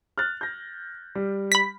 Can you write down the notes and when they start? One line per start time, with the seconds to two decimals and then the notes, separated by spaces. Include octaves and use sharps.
0.18 F6 F#6 A6
0.41 G6 A#6
1.15 G3
1.52 B5 B6